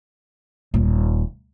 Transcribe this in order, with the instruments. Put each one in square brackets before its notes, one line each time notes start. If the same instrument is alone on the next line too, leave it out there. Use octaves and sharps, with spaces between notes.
[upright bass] D#1